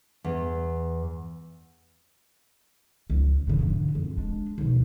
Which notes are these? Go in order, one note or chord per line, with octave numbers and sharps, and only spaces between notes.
E2
C#2
G#2 C#3
D3 E3
F2
G#3 D4
D#2 B2